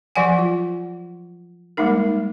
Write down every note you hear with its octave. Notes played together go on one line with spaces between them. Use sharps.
F3 F#3 D5 F#5 G#5
F4
G3 G#3 A#3 D#4 A#4